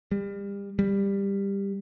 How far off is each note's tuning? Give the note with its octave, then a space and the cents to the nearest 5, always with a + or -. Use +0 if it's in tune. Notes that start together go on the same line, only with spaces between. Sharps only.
G3 +35
G3 +15